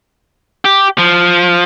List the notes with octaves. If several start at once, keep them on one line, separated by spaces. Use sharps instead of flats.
G4
F3